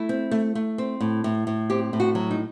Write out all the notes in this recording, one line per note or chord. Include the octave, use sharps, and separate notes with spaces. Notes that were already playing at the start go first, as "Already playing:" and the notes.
Already playing: A3 E4
C4
A3
A3
C4
A2
A2
A2
C4 G4
A2
F#4
F#3
D#4